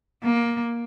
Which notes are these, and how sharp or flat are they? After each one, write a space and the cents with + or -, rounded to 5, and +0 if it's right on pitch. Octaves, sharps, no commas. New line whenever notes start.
A#3 +15